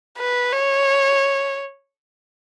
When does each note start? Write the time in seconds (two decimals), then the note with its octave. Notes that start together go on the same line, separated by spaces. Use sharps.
0.18 B4
0.53 C#5